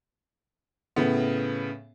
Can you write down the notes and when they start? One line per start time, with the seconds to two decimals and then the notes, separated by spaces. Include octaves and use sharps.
0.96 A2 C#3 B3